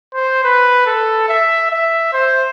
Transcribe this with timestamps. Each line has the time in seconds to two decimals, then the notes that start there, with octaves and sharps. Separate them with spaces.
0.14 C5
0.44 B4
0.86 A4
1.29 E5
1.71 E5
2.13 C5